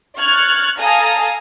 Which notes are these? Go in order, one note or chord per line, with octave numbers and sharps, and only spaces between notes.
C#6 F6 F#6 G#6 A6
A4 F5 G#5 A#5 D#6